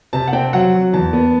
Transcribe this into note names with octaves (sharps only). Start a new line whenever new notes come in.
C3 A5
F#5
C4 G5
F#3 F#5
F#3
E2 A5
B3